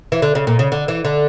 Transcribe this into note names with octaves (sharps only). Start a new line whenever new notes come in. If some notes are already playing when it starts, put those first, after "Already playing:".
E3
D3
C#3
A#2
C#3
D3
E3
D3